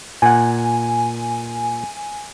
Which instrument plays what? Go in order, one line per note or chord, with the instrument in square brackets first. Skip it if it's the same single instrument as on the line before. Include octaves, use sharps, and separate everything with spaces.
[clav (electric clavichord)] A#2 F#5 [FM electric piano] G#5